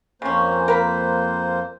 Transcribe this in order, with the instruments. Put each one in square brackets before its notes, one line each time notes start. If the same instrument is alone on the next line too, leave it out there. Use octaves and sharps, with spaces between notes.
[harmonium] F2 A#3 C5 [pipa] C#3 C#4
[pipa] A#4 B4